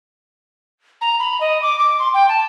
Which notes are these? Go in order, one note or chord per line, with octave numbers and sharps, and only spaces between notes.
A#5
B5
D#5
D6
D6
C6
G5
A5